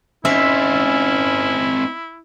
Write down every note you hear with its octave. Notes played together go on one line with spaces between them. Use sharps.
C4 C#4 D#4 E4 E5